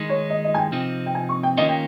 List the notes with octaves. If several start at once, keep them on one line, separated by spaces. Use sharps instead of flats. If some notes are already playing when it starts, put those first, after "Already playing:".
Already playing: D#3 G#3 D#4
C#5
D#5
D#5
G#5
G5
C3 F3 C4 D#4
G5
G#5
C#6
G5
D#3 A#3 C#4 F4 D#5
G5